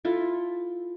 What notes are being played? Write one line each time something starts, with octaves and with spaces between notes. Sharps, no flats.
E4 F4 A4